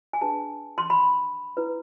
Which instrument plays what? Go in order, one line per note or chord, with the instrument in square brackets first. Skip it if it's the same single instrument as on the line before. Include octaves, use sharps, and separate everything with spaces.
[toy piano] G#5
D4 G#4 B4 A5
C6
B5
E4 B4